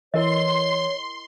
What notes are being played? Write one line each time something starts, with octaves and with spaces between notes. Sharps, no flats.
E3 E4 A#4 C#5 D#5 C6